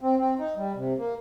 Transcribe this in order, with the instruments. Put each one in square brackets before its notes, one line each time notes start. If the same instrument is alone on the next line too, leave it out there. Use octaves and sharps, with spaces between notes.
[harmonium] C4
C4
D#4
G3
C3
A#3